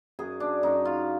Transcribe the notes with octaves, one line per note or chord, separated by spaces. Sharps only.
F#2 G#4
D4
F#2 D#4
F4